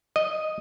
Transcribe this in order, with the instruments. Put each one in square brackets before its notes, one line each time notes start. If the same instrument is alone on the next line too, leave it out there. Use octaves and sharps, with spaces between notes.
[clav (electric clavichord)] D#5